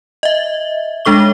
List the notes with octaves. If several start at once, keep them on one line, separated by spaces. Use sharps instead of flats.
D#5 E5
G#3 D4 A4 C#6 G7